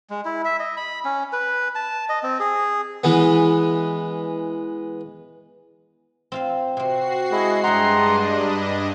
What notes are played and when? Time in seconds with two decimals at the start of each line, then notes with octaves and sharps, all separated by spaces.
0.10 G#3
0.25 E4
0.45 E5
0.60 D#5
0.77 B5
1.05 C#4
1.33 B4
1.75 A5
2.09 D#5
2.23 C4
2.40 G#4
3.04 E3 G#3 B3
6.32 C4 F4 C5
6.77 C3 C4 F#4 C7
7.32 G#3 E4 G#4 D#5
7.64 G2 D4 E4 G4 D#5 F#5 A#5 C6
8.50 B5